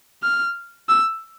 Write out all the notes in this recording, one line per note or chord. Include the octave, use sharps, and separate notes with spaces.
F6
E6